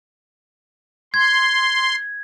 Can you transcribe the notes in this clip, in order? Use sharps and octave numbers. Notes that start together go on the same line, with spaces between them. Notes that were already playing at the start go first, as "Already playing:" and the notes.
C6 G#6